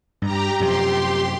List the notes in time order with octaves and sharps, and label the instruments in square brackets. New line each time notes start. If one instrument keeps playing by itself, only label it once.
[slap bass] G2 [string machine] G4 A#5
[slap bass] F#2 C3 F3 [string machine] G4 C6